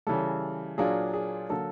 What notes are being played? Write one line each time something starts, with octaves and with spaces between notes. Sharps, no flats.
C#3 E3 G3 A4
A#2 F#3 A#3 D4 F4 G#4
G#4
D3 F#3 A#3 A4